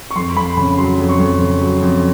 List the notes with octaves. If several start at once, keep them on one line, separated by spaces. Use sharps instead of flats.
C#6
F2 C6
F2 B5
C#3 B5
F#3 C6
F2
C#6
F2
C#3
F#3
F2